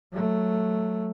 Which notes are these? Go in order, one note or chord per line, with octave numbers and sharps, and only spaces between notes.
F#3 A3